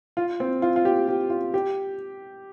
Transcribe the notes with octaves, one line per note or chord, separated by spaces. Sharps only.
F4
C4
F4
F4
G4
G4
F4
G4